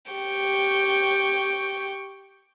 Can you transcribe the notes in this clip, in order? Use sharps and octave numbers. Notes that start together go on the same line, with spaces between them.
G4 G5 C#6